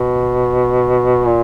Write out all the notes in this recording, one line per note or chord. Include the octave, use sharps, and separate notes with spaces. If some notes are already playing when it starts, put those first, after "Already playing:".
Already playing: B2
A#2